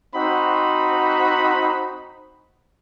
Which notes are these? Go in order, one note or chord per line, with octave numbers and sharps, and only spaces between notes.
C4 D#4 F#4 C5 F#5 B5